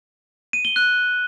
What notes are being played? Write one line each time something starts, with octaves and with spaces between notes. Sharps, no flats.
D#7
G7
F#6